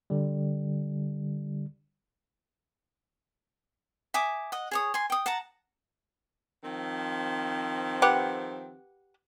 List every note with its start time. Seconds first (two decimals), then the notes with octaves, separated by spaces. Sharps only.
0.10 D3 G3
4.14 E5 G#5 D6 D#6
4.52 D#5 F#5
4.71 G#4 C#5 D#6
4.94 G#5 C6
5.10 G5 D#6
5.26 F#5 A5 A#5
6.64 D#3 F3 C4
8.02 G4 B4 F#5